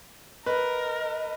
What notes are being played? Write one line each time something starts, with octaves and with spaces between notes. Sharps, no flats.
A#4 B4 D#5